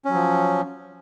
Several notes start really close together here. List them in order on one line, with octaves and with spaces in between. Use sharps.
C#4 F#3 F3